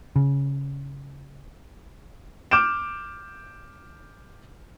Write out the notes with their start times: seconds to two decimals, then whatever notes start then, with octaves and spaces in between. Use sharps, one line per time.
0.16 C#3
2.51 D6 F6 G6 D7 E7